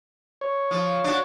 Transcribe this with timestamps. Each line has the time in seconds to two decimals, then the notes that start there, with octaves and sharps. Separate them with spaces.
0.41 C#5
0.71 F3
1.04 D4 F#4